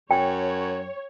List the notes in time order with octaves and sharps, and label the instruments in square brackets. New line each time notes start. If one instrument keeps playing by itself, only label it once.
[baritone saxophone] F#2 [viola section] C#5 [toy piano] G5